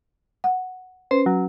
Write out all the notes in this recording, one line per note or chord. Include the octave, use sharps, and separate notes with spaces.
F#5
C#4 B4 C5
F#3